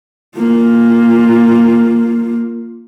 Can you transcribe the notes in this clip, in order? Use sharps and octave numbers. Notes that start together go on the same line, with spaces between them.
A#3 F4